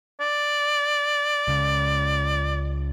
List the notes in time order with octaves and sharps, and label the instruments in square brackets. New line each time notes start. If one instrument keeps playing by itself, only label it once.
[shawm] D5
[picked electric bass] C#2 C#3